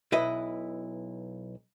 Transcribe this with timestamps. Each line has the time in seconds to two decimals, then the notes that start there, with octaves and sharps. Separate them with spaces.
0.12 B1 E4 B4 D#5